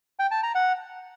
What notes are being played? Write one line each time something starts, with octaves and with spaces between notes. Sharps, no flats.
G5
A5
A#5
F#5